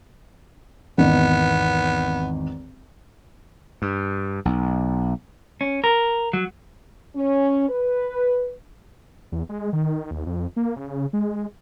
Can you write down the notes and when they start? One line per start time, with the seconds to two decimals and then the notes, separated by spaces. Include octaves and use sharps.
0.98 G#1 E2 D#3 B3
3.82 G2
4.45 B1
5.61 C#4
5.84 A#4
6.33 F#3
7.16 C#4
7.69 B4
9.32 E2
9.49 G#3
9.73 D#3
10.11 D#2
10.26 F2
10.56 A#3
10.76 C#3
11.13 G#3